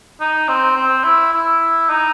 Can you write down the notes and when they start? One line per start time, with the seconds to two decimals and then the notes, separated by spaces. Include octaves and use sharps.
0.20 D#4
0.48 C4
0.76 C4
1.04 E4
1.33 E4
1.90 D#4